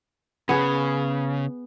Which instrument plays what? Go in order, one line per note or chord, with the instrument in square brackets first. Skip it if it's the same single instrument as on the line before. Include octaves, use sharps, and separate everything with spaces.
[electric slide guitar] C#3 [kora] B3 G#4